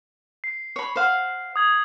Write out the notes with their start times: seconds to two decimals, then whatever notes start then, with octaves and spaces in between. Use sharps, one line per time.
0.44 C7
0.76 C#5 B5
0.96 C5 F5 F#5
1.56 D#6 G#6 F#7